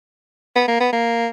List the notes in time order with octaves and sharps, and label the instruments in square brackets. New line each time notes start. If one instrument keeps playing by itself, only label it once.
[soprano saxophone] B3
A#3
B3
A#3